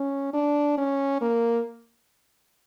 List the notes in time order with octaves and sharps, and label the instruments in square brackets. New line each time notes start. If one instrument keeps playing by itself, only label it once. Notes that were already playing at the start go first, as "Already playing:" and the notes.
Already playing: [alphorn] C#4
D4
C#4
A#3